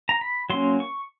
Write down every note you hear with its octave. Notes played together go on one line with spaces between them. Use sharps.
A#5
B5
F#3 A#3 C#4 C6
C#6